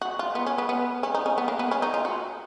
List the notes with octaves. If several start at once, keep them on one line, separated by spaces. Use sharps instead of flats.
F#4
F4
B3
C#4
B3
B3
C#4
D#4
C#4
B3
A#3
B3
C#4
D#4
F4
F#4